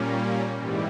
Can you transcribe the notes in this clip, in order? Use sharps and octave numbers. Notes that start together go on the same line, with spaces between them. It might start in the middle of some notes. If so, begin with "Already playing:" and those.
Already playing: A#2 G3 A#3 C#4
G#2 E3 G3